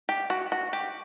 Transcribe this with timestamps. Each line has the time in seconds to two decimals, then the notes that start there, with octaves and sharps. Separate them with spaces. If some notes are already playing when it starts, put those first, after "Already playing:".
0.09 G4
0.30 F#4
0.52 F#4
0.73 G4